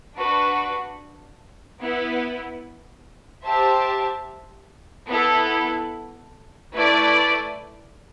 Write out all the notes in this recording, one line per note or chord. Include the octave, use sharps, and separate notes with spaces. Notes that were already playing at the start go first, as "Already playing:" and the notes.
D4 F#4 B4
B3 E4 B4
G4 C5 E5 A5
B3 E4 A4
A3 E4 B4 D5